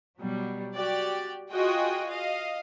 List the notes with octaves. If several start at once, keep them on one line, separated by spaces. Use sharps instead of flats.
B2 F#3 G3
F#4 G4 D5
F4 F#4 G#4 D#5 G5
D#5 F5